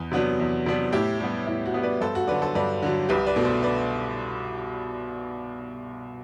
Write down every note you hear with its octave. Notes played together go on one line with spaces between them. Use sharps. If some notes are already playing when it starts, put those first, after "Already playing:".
Already playing: E2
C3 F#3 B3 D4
E2
C3 F#3 B3 D4
A2 E4 G4
G3 B3
A2 E4
F#4
G3 B3
B4 D5
G2 A4 C5
F#4
D3 F#3 B4 D5
A4 C5
G2 B4 D5
D3 F#3
C2 G4 B4
B4 D5
B2 A3 D4
A4 C5
B4 D5